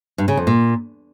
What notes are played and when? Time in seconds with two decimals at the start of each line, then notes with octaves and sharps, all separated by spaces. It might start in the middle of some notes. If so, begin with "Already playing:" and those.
0.18 G2
0.28 C#3
0.37 F2
0.47 A#2